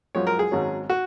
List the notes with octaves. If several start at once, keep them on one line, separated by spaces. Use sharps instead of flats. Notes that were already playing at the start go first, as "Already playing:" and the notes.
F#2 F3 G#3 C#5
A#4
G#4
G#1 G#2 F#3 C#4
F#4